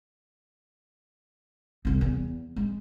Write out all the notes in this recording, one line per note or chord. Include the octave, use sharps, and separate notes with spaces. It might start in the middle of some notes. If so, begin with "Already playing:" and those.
C2 F2
E2
G#3